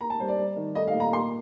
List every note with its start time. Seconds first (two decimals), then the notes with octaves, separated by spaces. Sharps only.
0.01 A#3 A#5
0.10 A5
0.19 G3 C5
0.28 D5
0.38 G3
0.56 D#3
0.75 A3 D#5
0.87 F5
0.94 A#2
1.00 A#5
1.12 A#3 C6